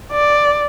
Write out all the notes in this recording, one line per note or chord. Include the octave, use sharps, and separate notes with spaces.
D5